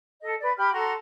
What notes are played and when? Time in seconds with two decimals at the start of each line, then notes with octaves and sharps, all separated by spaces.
0.22 A4 D#5
0.39 B4 D5
0.56 G4 B5 F6
0.73 F#4 A4 A#5 C6